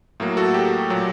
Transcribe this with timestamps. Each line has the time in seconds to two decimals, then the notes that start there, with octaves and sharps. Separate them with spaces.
0.20 A2 F#3 A#3
0.37 F#4 A4
0.54 G4
0.90 A#2 F#3